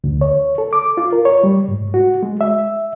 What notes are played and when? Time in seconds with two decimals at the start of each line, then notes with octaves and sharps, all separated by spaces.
0.04 D2
0.21 C#5
0.58 A4
0.73 D6
0.97 F4
1.13 A#4
1.25 C#5
1.44 G3
1.68 G#2
1.94 F#4
2.23 G#3
2.41 E5